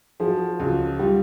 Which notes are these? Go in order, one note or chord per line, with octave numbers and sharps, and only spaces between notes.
F3 F#4 G#4
C#2 F#4 G#4
G3 F4 G4